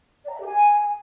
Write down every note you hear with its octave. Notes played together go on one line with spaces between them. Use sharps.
D5
A#5
E5
G4
G#5